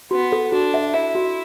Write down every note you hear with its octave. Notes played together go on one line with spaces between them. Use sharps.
B3 F#4
A4
D4 F#4
E5
E4 E5
F#4